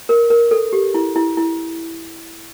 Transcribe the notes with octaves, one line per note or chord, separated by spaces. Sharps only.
A#4
A#4
A4
G4
E4
E4
E4